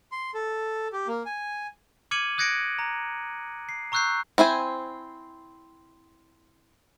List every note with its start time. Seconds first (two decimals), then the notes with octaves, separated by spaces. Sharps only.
0.12 C6
0.34 A4
0.93 G4
1.08 A#3
1.26 G#5
2.11 D6 F6 G#6 C#7 D#7 F#7
2.38 D#6 F#6 G#6 A#6 C#7 D7
2.79 A#5
3.69 C7
3.92 A#5 C#6 E6 F#6 G6 C7
4.38 C4 E4 C5 G#5